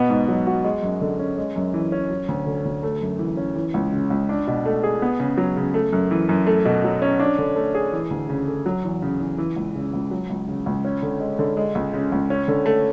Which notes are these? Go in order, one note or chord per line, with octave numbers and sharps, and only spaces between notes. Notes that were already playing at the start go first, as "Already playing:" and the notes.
Already playing: B2 B3
G#2
F#3
F#4
G#3
F#2
D3
C#4
G#3
F#2
E3
C#4
F#3
D2
D3
D2
A3
F#2
E3
C#4
E3
C#2
C#3
C#2
D4
B2
A3
G#4
B3
C#3
F#3
C#3
A3
F#2
E3
F#2
A3
B2
F#3
C#4
D4
D3
A3
G#4
E3
D2
C#3
A3
F#3
E2
C#3
E2
E3
C#2
C#3
C#2
F#3
C#2
C#3
C#2
C#4
D3
G#3
D3
G#3
C#2
C#3
C#2
C#4
D3
A3